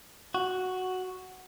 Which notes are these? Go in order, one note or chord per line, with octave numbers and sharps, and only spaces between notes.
F#4